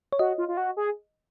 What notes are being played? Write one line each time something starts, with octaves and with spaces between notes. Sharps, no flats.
C#5
F#4 D#5
F4
F4
F#4
G#4